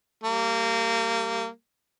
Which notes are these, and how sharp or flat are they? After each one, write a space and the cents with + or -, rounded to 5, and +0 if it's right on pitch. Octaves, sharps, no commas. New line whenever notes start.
G3 +0 A#3 -25